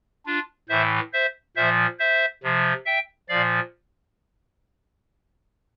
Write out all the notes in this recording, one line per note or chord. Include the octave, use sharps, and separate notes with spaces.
D4 F4
A2 E3 C5 E5
C5 E5
A#2 F3 C5 E5
C5 E5
C3 F3
E5 G5
A#2 F3 D5 F5